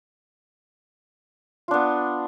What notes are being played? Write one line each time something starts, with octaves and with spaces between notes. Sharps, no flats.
B3 D4 F4